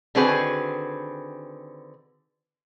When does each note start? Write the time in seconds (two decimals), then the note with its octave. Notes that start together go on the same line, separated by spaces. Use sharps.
0.15 D3 D#3 C4 F#4 G#4 B4